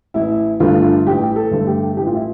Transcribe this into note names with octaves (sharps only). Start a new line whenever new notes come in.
A1 E4
G2 D3 A3 F4
A1 G4
A4
G2 D3 A3
G4
A1 G4
F4
E4